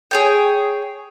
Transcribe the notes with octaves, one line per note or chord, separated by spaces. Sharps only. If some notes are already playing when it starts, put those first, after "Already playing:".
G#4 C#5 G5